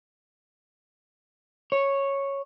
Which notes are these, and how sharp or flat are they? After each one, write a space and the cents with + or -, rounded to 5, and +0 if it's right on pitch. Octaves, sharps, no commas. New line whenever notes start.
C#5 -5